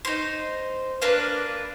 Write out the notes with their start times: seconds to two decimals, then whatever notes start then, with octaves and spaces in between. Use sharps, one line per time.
0.05 D#4 C5
1.02 A#3 D4 B4 F5